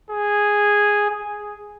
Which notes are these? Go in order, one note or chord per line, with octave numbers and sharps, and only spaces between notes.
G#4
G#4